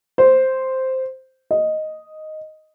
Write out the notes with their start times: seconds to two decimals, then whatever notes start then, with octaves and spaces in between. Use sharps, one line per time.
0.18 C5
1.51 D#5